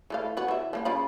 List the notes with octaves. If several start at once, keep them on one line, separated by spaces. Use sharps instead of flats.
E3 A3 F5
B3 F#4
E3 E5
F3 A#3 B3
C#3 F4 B5